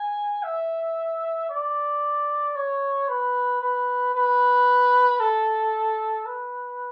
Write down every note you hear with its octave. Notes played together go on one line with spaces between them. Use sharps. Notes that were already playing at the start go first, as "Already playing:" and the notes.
Already playing: G#5
E5
D5
C#5
B4
B4
B4
A4
B4